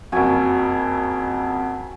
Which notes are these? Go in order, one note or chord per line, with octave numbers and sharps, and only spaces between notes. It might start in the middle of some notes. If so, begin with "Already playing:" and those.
F#1 F2 F#4 G#5